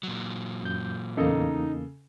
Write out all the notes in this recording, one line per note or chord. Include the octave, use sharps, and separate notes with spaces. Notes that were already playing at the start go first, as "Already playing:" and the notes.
A#2 F#3
F#2 G6
E2 C#3 A#3 D#4 A4